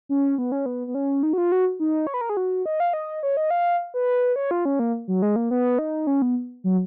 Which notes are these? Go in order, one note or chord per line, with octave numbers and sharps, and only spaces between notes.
C#4
B3
C#4
B3
B3
C#4
D#4
F#4
F4
F#4
D#4
C#5
B4
A#4
G#4
F#4
D#5
F5
D#5
C#5
D#5
F5
B4
C#5
F4
C#4
A#3
F#3
G#3
A#3
B3
D#4
C#4
B3
F#3